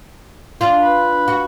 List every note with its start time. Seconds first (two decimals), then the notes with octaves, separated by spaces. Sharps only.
0.61 D4 F4
0.81 B4
1.28 F#4